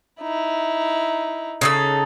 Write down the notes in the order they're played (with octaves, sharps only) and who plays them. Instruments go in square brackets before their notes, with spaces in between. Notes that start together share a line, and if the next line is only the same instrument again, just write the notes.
[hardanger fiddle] D#4 E4
[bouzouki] C#3 D#4 A4